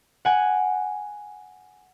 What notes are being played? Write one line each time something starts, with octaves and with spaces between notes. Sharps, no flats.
F#5 G#5 G#6